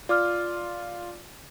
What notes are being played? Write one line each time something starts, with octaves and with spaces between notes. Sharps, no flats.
F4 D5 D6 F6